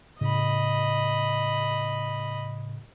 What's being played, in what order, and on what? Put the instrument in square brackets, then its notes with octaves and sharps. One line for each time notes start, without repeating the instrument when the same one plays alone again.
[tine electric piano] A2 C#3 [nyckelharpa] D#5 B5